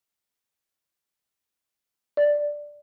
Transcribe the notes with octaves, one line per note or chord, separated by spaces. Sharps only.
D5